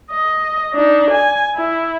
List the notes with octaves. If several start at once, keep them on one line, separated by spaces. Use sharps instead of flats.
D#5
D4 D#4
G#5
E4